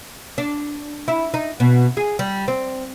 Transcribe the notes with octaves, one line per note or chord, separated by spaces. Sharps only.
D4
E4
D#4
B2
G#4
G3
C4